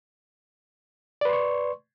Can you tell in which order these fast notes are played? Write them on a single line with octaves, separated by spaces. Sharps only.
D5 B4 C6 C#6